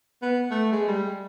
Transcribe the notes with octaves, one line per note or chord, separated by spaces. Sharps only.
B3
A3
G#3
G3